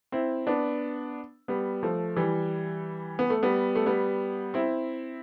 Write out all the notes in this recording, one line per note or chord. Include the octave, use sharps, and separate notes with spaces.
C4 E4
B3 D4
G3 B3
F3 A3
E3 G3
B3
A3
G3 B3
A3
G3 B3
C4 E4